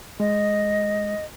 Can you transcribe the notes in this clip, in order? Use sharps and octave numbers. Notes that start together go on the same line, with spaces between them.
G#3 D#5